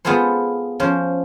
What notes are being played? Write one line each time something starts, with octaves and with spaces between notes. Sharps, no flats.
B3 F4 G#4 A4 C5
F3 C#4 C5